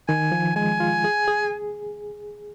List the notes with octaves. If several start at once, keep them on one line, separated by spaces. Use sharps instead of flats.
D#3 G#5
F3
G#3 G#5
F4
G#4
G#4